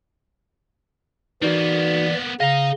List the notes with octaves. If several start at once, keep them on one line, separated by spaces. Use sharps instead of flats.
E3 A#3 B3 D#4 F#4 A4 D5
C#3 D#5 F5 A#5